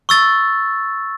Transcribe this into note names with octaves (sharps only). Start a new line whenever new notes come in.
C#6 E6 A6